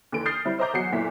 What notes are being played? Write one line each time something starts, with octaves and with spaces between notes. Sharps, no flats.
D#2 D3 E3 D7
D#6 F6 G6 A6 C7
G3 C4 E4
C5 D#5 E5 A#5 D6 G6
E2 F#3 F#4 D#6 C7 C#7
F#1 B1 A#2 E4 B6